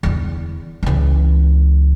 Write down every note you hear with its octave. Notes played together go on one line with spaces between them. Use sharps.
E2 D3
C#2 E3